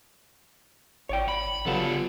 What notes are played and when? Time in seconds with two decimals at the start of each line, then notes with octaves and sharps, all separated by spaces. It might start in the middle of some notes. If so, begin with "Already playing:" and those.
1.09 G#1 C#5 D5 G5
1.28 B5
1.66 C#3 F#3 G3 B3 F4 A4